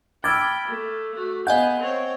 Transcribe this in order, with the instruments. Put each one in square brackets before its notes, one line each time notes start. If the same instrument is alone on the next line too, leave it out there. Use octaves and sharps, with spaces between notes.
[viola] G5 B5 [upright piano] D6 E6 [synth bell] F6 G#6 A6
[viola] A3
A3 F#4
[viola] B3 G#4 [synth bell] D#5 F5 G6 [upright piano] F#5 G#5
[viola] C4 C#5